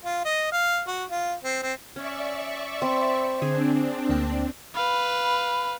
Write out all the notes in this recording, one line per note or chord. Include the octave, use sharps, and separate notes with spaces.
F4
D#5
F5
F#4
F4
C4
C4
C#4 D5 E5 C#6
C4 B5
D3 C4 D4 G#4
D2 A#3 G5
B4 F5 B5